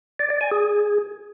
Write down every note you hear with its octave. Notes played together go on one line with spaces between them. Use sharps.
D5
D5
G#5
G#4